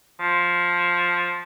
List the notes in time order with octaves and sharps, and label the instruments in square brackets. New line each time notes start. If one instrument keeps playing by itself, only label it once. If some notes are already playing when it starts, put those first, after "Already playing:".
[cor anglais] F3